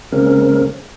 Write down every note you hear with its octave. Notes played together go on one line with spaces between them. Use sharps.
C#3 G#3 A#3 C4 C#4 A#4